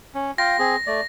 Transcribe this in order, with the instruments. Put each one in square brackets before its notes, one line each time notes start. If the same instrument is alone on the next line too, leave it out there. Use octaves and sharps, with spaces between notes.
[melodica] C#4
[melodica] F4 F5 G5 [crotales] A#6
[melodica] C4 G#4
A3 D5